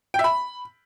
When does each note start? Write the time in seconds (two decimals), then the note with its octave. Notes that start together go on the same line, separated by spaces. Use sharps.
0.14 G5
0.19 E5
0.24 B5